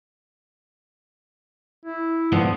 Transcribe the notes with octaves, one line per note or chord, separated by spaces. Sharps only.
E4
G#2 F3 B3 D4